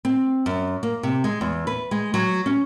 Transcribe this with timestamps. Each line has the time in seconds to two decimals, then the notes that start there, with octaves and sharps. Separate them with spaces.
0.05 C4
0.46 F#2
0.83 A#3
1.03 C3
1.24 G#3
1.41 E2
1.67 B4
1.91 G#3
2.14 F#3
2.46 C#4